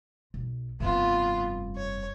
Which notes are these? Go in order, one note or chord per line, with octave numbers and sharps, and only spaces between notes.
B1
F1 G2 B3 F4
C#5